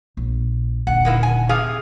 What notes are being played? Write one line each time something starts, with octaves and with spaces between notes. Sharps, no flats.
A#1
D#1 D3 F#5
G#3 A#3 E4
G#5
C3 G#4 F5